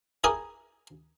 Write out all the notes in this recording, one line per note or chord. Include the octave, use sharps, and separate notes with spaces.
E4 G4 G#4 A#4 G#5 D#6